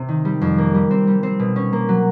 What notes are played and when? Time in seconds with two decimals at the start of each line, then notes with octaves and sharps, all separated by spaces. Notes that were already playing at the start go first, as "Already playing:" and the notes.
Already playing: C3
0.08 D#3
0.25 G3
0.41 F2
0.58 A#3
0.74 G3
0.91 C4
1.07 G3
1.23 C4
1.39 B2
1.56 C#4
1.73 A#3
1.89 F#3